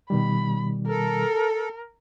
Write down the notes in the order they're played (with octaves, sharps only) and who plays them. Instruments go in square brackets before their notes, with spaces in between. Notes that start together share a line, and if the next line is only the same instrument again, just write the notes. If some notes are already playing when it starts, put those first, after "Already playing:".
[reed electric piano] B2 D#3 G3 [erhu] B5
[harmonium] A4 [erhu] A#4